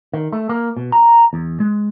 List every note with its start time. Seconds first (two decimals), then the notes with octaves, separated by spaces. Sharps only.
0.14 D#3
0.33 A3
0.49 A#3
0.77 B2
0.92 A#5
1.33 E2
1.60 G#3